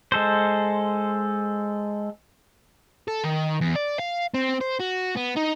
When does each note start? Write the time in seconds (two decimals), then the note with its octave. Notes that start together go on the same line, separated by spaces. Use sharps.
0.12 G#3 A4 C5
3.08 A4
3.24 D#3
3.61 E2
3.76 D5
3.99 F5
4.34 C4
4.61 C5
4.79 F#4
5.16 B3
5.36 D#4